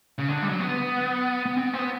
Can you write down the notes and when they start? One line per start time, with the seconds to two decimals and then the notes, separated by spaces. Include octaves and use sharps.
0.18 C#3
0.28 D3
0.42 G3
0.49 F#3
0.60 B3
1.46 B3
1.56 C4
1.67 B3
1.73 C4
1.78 B3